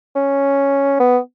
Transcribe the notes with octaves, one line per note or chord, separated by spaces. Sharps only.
C#4
B3